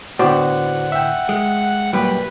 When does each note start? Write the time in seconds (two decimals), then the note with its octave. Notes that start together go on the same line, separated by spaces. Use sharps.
0.19 A2 D3 B3 F#4 C5 D5 F#5
0.92 E5 G5
1.29 G#3
1.93 F#2 A#2 G3 B4